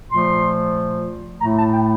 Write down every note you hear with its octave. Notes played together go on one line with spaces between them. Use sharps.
A#2 F3 A3 C6
A2 A3 A#5
A5
G5